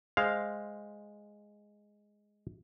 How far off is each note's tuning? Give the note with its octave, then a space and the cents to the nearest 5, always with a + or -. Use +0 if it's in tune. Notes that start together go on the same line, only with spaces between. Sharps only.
G#3 +0 C5 +0 F5 +0